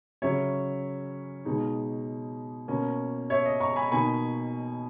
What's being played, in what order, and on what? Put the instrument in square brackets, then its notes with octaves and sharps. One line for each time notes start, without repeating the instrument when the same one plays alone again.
[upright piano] C#3 F#3 C#4 C#5 E5
B2 G#3 D#4
B2 A#3 C#4
C#5 E5
D#5
A#5 C#6
G#5 B5
B2 A#3 D#4 G#5 B5